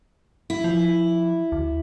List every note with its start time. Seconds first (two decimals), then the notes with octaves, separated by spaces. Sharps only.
0.50 E4
0.64 F3
1.52 D2